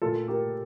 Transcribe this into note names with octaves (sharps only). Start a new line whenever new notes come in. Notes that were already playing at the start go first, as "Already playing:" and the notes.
A#2 A3 F4 A4
G4 A#4